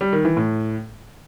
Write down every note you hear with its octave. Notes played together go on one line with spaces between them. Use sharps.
G3
D#3
E3
A2